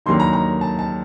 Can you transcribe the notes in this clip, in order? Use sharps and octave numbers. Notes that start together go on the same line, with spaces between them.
D#2 D3 F#3 A#3 D#4 C6
A#5
A#5
A5
A5